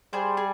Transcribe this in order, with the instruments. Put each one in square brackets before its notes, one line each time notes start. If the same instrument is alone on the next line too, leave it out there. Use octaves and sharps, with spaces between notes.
[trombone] G3 [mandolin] G#4 C5
[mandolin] G#4